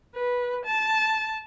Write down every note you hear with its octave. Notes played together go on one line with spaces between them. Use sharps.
B4
A5